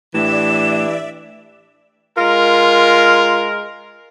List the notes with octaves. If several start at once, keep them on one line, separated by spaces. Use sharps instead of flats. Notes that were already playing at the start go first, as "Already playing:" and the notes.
A2 E3 D4 G4 D5 E5 E7
G#3 F4 A#4